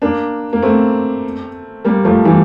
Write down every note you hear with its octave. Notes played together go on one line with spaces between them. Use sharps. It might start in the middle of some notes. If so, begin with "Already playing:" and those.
A#3 D4
A#3
A3 C4
G3 A#3
F3 A3
E3 G3